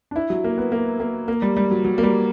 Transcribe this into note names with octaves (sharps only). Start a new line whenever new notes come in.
D4
E4
F#3
A#3
B3
A#3
A#3
A#3
G3
G3
F#3
F#3
A#3
G3